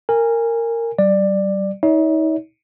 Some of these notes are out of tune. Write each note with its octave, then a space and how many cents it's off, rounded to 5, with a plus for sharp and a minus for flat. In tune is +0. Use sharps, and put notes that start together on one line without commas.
A#4 -15 G#5 -20
G3 -30 D5 +15
D#4 +35 C#5 +45 E5 -40